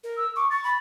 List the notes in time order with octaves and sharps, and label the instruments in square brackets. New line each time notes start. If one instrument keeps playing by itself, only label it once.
[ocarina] A#4
[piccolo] E6
[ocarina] C#6 [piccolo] D6
[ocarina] C#6 [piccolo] A6
[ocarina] B5